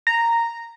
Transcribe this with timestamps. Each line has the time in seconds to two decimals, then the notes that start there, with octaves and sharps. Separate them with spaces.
0.07 A#5